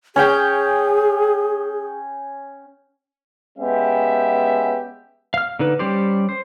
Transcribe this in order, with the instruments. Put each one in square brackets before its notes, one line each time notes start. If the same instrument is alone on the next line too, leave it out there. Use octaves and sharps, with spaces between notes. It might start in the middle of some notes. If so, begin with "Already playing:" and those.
[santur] C#4 C#5 G5 [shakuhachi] G#4
[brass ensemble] G#3 B3 C#4 G4 E5
[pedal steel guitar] F5 F6
D3 D#4 B4
G3 C#4 G4 C5 D5
C5